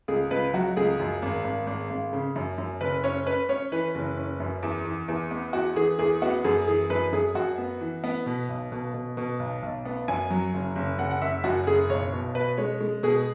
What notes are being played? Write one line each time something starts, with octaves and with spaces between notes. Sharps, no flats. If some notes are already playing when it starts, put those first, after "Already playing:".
C#2 G#4
C#2 B4
F#3 F#4
C#2 G#4
F#2
G#1
G#1
G#1
G#1
C#3
F#2
F#2
F#1 B4
C#4 C#5
C#4 B4
C#4 C#5
E3 B4
F#1
C#4
F#2
E2
E3
E2
B3
E2 F#4
E3 G#4
E2 G#4
B3 F#4
F#2 G#4
E3 G#4
F#2 B4
F#2 G#4
F#2 F#4
B3
E3
B3
B2
B1
B2
B2
B2
B1
B1
B3
F#2 G#5
F#3
F#1
F#1
F#1 F#5
F#5
F#1 E5
F#2 F#4
F#1 G#4
B1 C#5
B2
B2 B4
G#3 C#5
G#3
B2 G#4